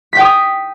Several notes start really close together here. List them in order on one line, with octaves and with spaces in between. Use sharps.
B6 G5 D#6